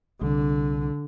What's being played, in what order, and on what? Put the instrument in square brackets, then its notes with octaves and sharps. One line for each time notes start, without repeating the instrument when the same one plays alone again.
[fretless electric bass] C2 [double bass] D3